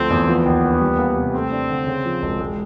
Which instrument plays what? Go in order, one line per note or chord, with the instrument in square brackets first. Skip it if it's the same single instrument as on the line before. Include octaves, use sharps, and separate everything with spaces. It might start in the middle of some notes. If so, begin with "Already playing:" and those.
Already playing: [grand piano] D2 F3 A3 [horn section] C4
[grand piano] E2
[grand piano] F3 [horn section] B3
[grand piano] D#2
D#2
G3
A#3
C3
[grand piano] A3 [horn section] C4
[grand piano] D4
D3
C#3
F3
E1
G#3